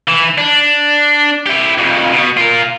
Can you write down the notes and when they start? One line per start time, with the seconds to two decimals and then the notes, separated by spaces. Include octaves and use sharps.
0.08 E3
0.38 D4
1.46 E4 G4
1.78 F2 C#3
2.12 B2 B3
2.37 F4 A#4